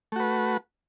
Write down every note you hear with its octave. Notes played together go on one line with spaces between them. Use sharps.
A3 F#4 B4